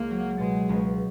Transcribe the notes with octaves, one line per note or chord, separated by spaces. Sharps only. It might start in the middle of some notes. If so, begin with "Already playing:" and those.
Already playing: C#2 A#3
F#3
B2 G#3
C#2